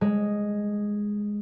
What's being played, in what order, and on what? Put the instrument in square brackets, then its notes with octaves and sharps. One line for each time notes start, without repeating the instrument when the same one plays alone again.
[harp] G#3